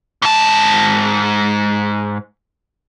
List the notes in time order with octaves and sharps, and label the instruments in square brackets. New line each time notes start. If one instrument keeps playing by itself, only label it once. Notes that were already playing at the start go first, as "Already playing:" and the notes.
[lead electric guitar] G#2 A5